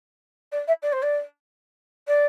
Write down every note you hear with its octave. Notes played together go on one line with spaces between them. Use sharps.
D5
E5
D5
C5
D5
D5